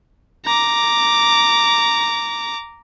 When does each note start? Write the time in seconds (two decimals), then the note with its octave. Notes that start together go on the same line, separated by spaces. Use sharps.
0.46 A#5 D6